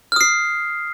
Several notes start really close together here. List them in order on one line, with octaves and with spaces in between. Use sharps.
F6 D#6 C7